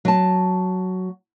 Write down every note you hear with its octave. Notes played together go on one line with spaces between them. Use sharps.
F#3 A5